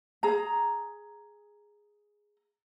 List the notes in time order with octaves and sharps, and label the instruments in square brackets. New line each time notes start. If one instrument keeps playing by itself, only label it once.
[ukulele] G#4 A#5